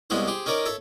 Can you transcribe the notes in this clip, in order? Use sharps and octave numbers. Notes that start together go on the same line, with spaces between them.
C2 G#3 B3 C#4 E4 C5
G4 G#4 C5
C#4 D#4 A#4 C#5 D5
A4 C#5 E5